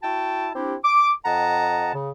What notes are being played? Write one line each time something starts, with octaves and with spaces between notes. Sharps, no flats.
E4 F#4 G5 A5
C4 D4 E4 G4
D6
F2 D#5 F#5 A5 A#5
C#3